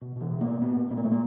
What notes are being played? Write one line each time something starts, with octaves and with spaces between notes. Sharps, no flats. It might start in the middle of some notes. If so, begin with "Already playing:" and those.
B2
B2 E3
B2
A#3
B2
A#2 B3
A#2
A#2 B3
A#3
A#2 A3
A#3